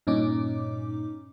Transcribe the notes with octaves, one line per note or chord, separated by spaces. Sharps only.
G2 A#2 C#4 D#4 D6